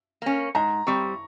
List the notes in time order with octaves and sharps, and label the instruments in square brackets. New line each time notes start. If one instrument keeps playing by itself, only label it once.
[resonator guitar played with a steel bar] A#3 C#4
[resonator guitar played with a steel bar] G#2 [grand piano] A#5
[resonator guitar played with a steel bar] G3 C4 [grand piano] C#6